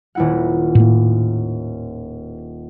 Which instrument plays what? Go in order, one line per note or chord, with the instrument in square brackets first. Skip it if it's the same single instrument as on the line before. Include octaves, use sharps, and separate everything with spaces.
[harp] D#1 E4 F#5
[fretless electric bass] A2 A#3